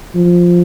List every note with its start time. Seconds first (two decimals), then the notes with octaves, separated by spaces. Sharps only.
0.15 F3